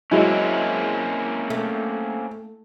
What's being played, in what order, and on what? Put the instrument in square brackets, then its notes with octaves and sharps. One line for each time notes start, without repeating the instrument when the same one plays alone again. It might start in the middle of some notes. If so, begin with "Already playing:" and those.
[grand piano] F#3 [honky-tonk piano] G#3 E4 [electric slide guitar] A#3 C4 C#4
[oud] A3